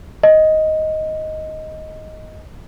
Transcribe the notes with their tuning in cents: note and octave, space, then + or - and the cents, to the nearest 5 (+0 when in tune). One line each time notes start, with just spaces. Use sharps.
D#5 +10